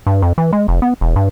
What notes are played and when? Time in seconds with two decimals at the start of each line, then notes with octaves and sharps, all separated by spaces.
0.07 G2
0.22 F2
0.38 E3
0.53 G#3
0.68 F1
0.82 B3
1.01 E1
1.16 G2